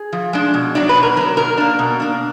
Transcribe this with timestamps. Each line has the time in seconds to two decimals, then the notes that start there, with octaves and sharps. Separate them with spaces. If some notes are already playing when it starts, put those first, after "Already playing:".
Already playing: G#4
0.13 F3
0.33 G#3 D4
0.54 B2
0.75 F#3 D4 D5
0.89 B4
0.96 B2
1.03 A#4
1.17 F#3 B4
1.21 D4
1.37 B2 A#4
1.58 A#3 D4
1.79 B2
2.00 A#3 D4